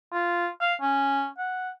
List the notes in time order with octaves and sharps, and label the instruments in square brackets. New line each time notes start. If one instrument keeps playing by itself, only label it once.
[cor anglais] F4
F5
C#4
F#5